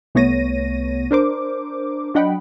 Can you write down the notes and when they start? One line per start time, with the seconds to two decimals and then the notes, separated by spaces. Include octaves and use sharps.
0.15 C2 A3 B3 C#5 A#6 D#7
1.11 D4 A#4 C5 D6
2.14 F#3 D4 D#5 F#5 G5 B5